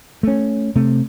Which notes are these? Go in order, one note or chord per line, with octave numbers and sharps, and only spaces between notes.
A3 C#4
C3 A3